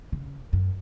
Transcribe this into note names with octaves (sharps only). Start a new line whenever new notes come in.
C#3
F#2